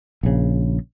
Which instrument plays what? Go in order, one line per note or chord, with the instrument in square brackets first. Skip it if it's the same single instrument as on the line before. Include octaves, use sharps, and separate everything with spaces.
[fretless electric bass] A#1 C#3